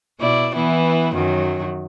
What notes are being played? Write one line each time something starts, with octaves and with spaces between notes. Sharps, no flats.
B2 E4 D5
E3 B3 E4
F#2 D#3 F#3